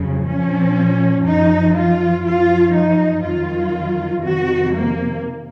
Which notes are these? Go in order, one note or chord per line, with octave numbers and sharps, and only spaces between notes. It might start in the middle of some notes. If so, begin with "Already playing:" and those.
Already playing: F2 C#3 F#3
A#2 F3 C#4
F#2 F3 D#4
F4
F#2 F3 F4
D#4
F2 D#3 F#3 F4
F2 C3 D#3 F#4
A#3